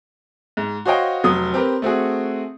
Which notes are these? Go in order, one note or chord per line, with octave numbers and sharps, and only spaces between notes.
G#2
F#4 C5 C#5 D#5 F5 G5
F1 F#3 D#6
C4 G4 A#4 B4
A3 C4 F#4 G#4